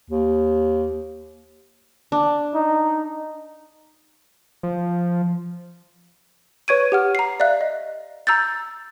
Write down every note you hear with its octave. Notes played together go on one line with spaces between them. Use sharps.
D#2
D4
D#4
F3
B4 C#5 C#6 G#6 D7 D#7
G4 F#5 F6
A#5 C7
D5 E5 F5 F#6
D#5
A#5 E6 G6 A6